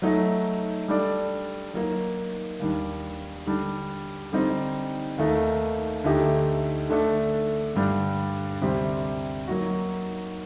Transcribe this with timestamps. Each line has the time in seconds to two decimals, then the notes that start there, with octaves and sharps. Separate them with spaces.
0.02 F#3 A3 D#4
0.88 G3 D4 A4 D5
1.74 F#3 A#3 D#4
2.59 D#2 D#3 G3 D4
3.47 D3 G3 D4
4.32 D3 G3 C4 D#4
5.18 D#2 D#3 A3 D#4
6.04 D2 D3 A3 D#4 G4
6.89 D3 A3 D4 A4
7.75 G2 D3 G3 D4
8.61 D2 C3 G3 C4 G4
9.47 F#3 A#3 D#4 F#4